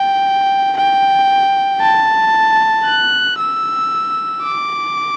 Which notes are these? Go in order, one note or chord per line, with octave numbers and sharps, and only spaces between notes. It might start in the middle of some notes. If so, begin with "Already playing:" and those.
Already playing: G5
G5
A5
F#6
E6
D6